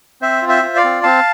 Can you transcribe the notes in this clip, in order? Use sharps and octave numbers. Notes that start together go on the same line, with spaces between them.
C4 C5 E5
F4
C5 E5
F4
D5 F5
C4
C4 F5 A5